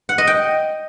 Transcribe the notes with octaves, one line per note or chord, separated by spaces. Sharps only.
F#5
D#5
G5